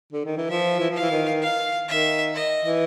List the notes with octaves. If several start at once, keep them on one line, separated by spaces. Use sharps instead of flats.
D3
D#3
E3
F3 E5
E3
F3
E3 F5
D#3
F5
D#3 E5
D#5
E3